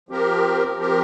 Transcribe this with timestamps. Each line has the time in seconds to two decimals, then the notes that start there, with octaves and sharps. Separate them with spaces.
0.09 F3 C4 G4 A#4
0.78 F3 C4 G4 A#4